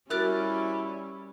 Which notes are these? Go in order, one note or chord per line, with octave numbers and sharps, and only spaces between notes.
G3 C#4 E4 F#4 A#4 D5 F6 F#6